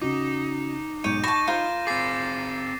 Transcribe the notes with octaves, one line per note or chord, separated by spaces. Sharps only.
C#3 D#4 F#4 D6
B1 G#2 C#5 G6 D#7
A5 B5 C#6 A#6 E7
F4 A#4 C5
C4 G#4 D6 A6 C7